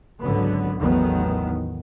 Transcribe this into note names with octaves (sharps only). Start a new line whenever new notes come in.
G#1 C#2 D3 F#3 B3
A1 E2 D#3 F#3 A3 B3